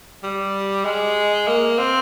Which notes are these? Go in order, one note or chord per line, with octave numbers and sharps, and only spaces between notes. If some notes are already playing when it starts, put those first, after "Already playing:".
G3
G#3
A#3
C4